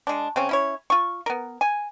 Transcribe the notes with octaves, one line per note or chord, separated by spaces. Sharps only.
G#3 D4
C#3 C4 C#4
C#4 E4 C#5
F4 C#6
B3 A#4
G#5